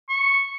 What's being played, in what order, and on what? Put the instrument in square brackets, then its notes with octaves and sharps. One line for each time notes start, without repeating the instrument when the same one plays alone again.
[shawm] C#6